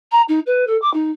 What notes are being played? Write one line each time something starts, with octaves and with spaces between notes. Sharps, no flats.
A#5
D#4
B4
A4
D6
D#4